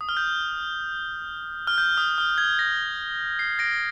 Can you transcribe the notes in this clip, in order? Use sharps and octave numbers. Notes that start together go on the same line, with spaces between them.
D#6
F6
G6
F6
G6
D#6
F6
G#6
A#6
C7
A#6 D7